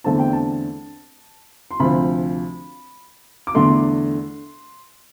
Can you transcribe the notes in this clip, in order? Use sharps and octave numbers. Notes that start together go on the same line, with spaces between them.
E2 D3 A3 C4 A5
G5
A5
C6
D2 C3 F3 C4 B5
D6
E2 D3 A3 C6